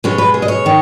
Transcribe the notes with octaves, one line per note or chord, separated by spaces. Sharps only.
B2 G#3 C#4 C#5
B4
G#4
D#5
C#5
D#3